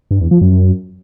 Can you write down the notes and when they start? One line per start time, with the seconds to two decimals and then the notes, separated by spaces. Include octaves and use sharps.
0.11 G2
0.21 E2
0.31 F3
0.41 F#2